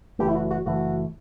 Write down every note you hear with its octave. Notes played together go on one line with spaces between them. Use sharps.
F#1 F#2 E3 A3 G4
E4
F#4
F#4
F#1 F#2 E3 A3 F#4